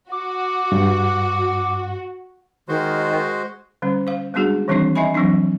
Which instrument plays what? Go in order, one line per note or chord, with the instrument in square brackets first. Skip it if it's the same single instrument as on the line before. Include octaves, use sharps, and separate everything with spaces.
[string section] F#4 [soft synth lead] D6
[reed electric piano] G2
[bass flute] D#3 [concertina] G#3 F#4 C5
[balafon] D3 G3 C#4
C5 F5
G3 G#3 B3 D4 F#4 G#4
D#3 E3 G3 C4 D4 D#4
D#4 D#5 E5 G#5 B5
E3 F#3 C4 D4 D#4